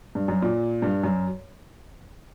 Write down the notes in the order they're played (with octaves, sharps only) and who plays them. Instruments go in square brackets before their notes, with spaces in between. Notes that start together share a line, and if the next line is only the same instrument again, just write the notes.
[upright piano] G2
F#2
A#2
G2
F#2